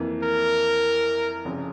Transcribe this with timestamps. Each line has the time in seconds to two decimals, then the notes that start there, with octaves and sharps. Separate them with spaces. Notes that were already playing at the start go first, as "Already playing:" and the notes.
Already playing: F2 E3 A#3
0.24 A#4
1.45 F1 F2 C#3